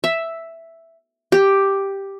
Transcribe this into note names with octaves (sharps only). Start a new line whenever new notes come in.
E5
G4